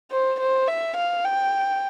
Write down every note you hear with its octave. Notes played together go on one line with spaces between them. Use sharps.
C5
C5
E5
F5
G5